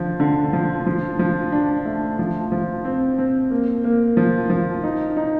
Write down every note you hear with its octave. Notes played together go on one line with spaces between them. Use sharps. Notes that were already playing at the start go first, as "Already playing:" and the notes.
Already playing: D3 F3
D3
F3
F3
F3
D4
A3
F3
F3
C4
C4
A#3
A#3
F3
F3
D#4
D#4